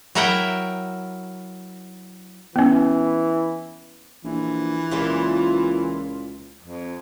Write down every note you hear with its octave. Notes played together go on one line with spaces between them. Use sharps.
F#3 E4 A#4 E5 F#5 G5
E3 B3 C#4
A#1 E3
C#2 A#2 E4 F4
F2